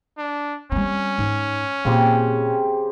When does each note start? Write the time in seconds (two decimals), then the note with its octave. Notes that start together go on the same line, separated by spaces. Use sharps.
0.18 D4
0.72 G3 C4 C#4
1.18 G#2
1.85 A#2 C#3 C4 G4